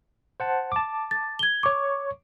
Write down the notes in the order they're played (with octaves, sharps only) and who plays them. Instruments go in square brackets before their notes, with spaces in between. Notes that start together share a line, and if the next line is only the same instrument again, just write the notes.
[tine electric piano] C5 F#5 A5
A5 D6
[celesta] A6
G#6 G7
[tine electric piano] C#5 C#6 [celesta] D6